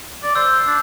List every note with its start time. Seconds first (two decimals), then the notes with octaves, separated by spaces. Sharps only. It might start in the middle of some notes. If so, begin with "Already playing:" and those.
0.23 D5
0.35 C5 E6
0.67 D4